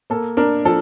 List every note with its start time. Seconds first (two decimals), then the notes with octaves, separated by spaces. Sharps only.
0.10 A#3 A4
0.37 D4 A#4
0.65 F3 A4